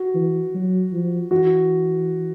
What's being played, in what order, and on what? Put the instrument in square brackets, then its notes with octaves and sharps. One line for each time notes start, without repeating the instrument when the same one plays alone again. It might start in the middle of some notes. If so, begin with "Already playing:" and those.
Already playing: [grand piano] F#4
[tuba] E3
F#3
F3
[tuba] E3 [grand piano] F#4